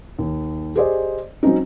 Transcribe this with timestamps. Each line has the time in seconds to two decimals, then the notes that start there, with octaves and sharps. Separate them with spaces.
0.19 D#2
0.76 G4 G#4 C5 D5 D#5
1.43 F#3 C4 C#4 D#4